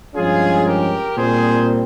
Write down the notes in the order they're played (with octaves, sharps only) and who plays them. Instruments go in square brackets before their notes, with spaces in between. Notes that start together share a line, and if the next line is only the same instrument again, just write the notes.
[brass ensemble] G2 F3 G#3 C#4 F4 G#4
G4 A#4
A#2 G3 C4 G#4 C5